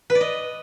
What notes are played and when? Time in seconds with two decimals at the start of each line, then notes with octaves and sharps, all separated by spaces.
0.10 B4
0.15 D5
0.21 D#5